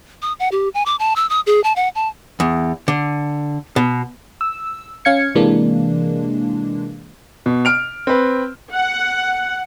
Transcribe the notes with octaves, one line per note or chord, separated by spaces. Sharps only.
D#6
F#5
G4
G#5
D6
A5
E6
D#6
G#4
A5
F#5
A5
E2
D3
B2
E6
C#4 F5 G#6 C#7
C3 E3 G#3 A#3 D4
B2
F6 D7 F7
C4 B4
F#5